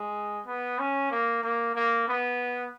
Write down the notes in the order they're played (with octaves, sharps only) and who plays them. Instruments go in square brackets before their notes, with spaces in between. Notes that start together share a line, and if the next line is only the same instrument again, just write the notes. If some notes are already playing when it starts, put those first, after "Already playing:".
Already playing: [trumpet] G#3
B3
C#4
A#3
A#3
A#3
B3